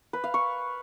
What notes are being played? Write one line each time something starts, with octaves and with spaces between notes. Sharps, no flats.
B4
F5
C#6